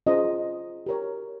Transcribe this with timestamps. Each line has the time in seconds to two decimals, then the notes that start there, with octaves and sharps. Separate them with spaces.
0.06 C#4 F4 G#4 C5 D#5
0.86 G4 A#4 C#5